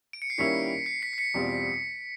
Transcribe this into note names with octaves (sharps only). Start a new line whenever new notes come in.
D7
C#7
C7
D#3 G3 A#3 C#4 E4 B6 C#7
C7
B6 C#7
C7
B6 C#7
E2 B2 G3 C4 F4